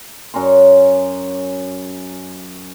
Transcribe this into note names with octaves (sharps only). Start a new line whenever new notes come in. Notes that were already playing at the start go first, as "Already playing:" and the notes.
F#2 C#4 A#5 C6